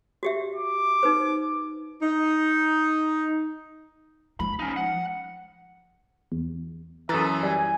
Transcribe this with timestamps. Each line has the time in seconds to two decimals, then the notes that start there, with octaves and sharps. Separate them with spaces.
0.23 F#4 G4 E5
0.55 D6
1.03 D#4 B4 C5
2.03 D#4
4.40 F3 G#3 B5
4.59 C#4 D#4
4.77 F#5
6.32 E2
7.09 F#2 E3 A4 E5 A#5 D#6 F6 A6
7.43 G3 G#5